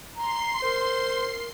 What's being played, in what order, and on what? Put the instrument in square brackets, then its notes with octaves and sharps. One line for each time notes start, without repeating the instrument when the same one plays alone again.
[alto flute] A#5 [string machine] C6 C7
[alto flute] A#4 [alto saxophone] C5